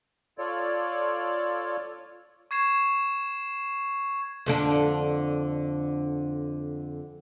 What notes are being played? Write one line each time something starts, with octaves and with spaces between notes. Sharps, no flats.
F4 A4 C#5 D5
C#6 G#6 C7 E7
F2 D3 D4